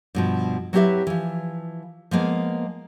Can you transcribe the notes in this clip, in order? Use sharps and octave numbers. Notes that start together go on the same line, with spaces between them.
G2 B2 F3
F#3 C4 E4 G4 B4 E5
E3 F3
F3 G#3 A#3 B3